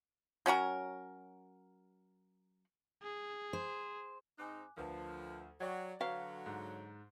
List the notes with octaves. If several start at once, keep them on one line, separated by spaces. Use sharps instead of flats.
F#3 C#4 F#4 A#4
G#4
C5
G#2 C4 D#4 G#5 D6 F#6
D2 D3 F3 A#4 B4 A5
F#3 D5 F#5 G5 C#6 G#6
D3 F#3 F#4 B4 F5 A#5 B6
G#2 F#6